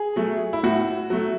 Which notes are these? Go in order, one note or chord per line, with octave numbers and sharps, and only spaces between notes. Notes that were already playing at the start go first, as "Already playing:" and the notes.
Already playing: G#4
F#3 A3
E4
A2 F#4
F#3 A3